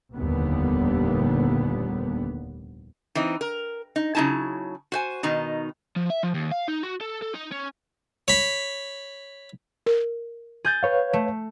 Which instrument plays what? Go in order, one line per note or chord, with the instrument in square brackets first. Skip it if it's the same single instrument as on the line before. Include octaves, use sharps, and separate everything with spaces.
[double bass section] F1 D#2 A#2 D3 G3 B3
[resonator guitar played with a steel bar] E3 C4 D#4
A#4
D#4
C#3 F#3 D#4 E4 A5
F#4 C5 G#5
B2 D#3 D#4
[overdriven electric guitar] F3
E5
F3
D#2
F5
D#4
F#4
A4
A4
D#4
C#4
[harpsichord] C#5 B5
[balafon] A#4
[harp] G#4 G6 A6
[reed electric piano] B4 C#5 F5
[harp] A3